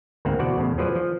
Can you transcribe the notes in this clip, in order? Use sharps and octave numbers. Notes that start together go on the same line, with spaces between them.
D2 G#2 A#3 C4 E5 F#5
E2 B2 F#4 C5 D5 F#5
E2 A2 C#3
F3 F#3 G#4 B4 C5 D5
F3